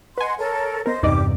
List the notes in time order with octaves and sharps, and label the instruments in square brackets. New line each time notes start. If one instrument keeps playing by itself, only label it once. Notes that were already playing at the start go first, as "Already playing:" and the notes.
[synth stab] B4 G#5 [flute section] D#5 F#5 C6
[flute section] A4 A#4 C#5
[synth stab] B3 A#4 [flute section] C5 D#5
[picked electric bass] E2 G2 C3 [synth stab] D#4 D5 D#5 [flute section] G4 D6